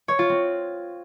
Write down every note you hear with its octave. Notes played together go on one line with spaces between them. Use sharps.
C#5
F4
C4